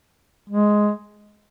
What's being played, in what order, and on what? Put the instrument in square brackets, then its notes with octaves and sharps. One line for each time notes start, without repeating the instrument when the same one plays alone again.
[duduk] G#3